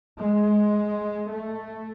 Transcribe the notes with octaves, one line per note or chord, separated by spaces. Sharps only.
G#3
A3